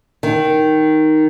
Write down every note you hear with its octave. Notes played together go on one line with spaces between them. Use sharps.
D#3